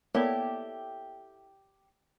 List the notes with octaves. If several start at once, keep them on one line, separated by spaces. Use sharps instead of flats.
A#3 B3 E4 G4 A4 C#5 D5